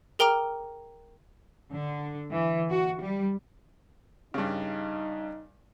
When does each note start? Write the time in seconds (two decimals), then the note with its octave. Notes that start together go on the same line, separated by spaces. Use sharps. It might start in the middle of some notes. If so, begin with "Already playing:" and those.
0.19 G#4 A#4 G5 A#5 D6 F6
1.73 D3
2.32 E3
2.70 F#4
3.01 G3
4.34 G2 C#3 D#4